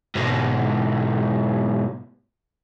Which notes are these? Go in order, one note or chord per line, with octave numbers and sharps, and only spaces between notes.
G#2 B2